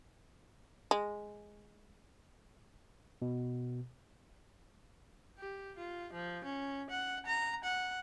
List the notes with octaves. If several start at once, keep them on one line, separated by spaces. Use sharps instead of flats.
G#3
B2
G4
F4
F3
C#4
F#5
A#5
F#5